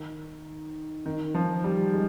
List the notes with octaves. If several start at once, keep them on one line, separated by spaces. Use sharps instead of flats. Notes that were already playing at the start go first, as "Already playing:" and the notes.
Already playing: D#3
D#3
F3
G3
G#3